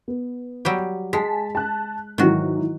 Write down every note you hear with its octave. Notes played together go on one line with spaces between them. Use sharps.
B3
F#3 G3 G4
G#3 G#5 A5 B6
A5 F#6
G#2 D#3 E3 F#3 F#4